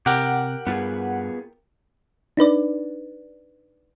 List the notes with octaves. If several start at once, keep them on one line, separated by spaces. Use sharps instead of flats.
C3 G4 A#4 F#5
G2 B3 F4 G#4
D4 D#4 B4 D5